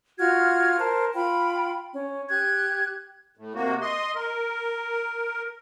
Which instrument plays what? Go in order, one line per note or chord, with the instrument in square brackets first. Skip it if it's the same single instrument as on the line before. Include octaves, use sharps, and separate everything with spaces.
[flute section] F4 F#4 F6 G#6
A#4 C5 A5
F4 G5 B5
C#4
G4 F#6 G#6
[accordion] A2
C3 A#3 F#4
D#5 C6
A#4